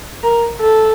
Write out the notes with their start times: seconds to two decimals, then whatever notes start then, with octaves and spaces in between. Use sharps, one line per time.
0.23 A#4
0.61 A4